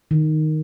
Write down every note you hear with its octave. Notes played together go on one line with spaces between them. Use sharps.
D#3